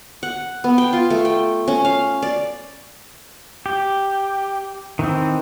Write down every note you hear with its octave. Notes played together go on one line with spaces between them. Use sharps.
F#5
B3
G5
F4
A3
G5
C#4
F5
D5
G4
D#3 E3 C4